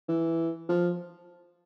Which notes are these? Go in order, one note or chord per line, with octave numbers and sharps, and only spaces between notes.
E3
F3